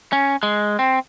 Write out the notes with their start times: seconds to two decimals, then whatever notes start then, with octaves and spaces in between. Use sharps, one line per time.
0.13 C#4
0.43 G#3
0.79 C4